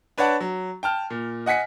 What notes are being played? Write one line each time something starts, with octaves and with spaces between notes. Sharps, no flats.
D4 B4 C#5 D5 F#5 A5
F#3
G5 A5 F6
A#2
D#5 F#5 G#5 B6 C#7